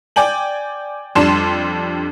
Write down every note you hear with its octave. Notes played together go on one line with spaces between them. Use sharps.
D5 G5 G#5 F#7
F2 G3 D4 C6 E7